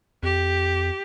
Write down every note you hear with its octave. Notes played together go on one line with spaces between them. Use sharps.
F2 G4